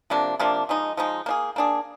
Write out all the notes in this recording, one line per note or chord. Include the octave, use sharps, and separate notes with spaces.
C3 F3 A#3 D4
C3 F3 A#3 D4
F3 G#3 D#4
F3 G#3 D#4
A#3 D4 G#4
A#3 D4 G#4